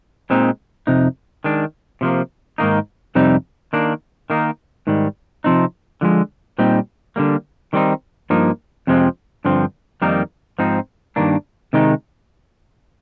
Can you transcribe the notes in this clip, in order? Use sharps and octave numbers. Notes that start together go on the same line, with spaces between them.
A#2 G#3 C4 D#4
F2 C3 D#4
D#3 G#3 D4
C3 F3 A#3
G#2 D#3 A#3 D#4
F2 C3 G3 C4 D#4
D#3 A#3 D4
D#3 A#3 D#4
G#2 D#3 G3
C3 F3 C4 D#4
D3 F3 G#3
A#2 G3 C4 D#4
D3 G3 A#3
D#3 G3 C4 D#4
G2 F3 A#3 D#4
F2 C3 F3 G#3 C4
G2 D3 F3 C4
F2 D#3 G3 A#3 D#4
G#2 F3 C4 D#4
G2 D#3 A#3 D4
C3 D#3 G#3 D#4